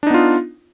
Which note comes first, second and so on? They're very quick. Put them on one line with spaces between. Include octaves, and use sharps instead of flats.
D4 D#4 B3 F4